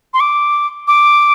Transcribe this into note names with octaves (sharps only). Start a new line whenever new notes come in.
C6
D6
D6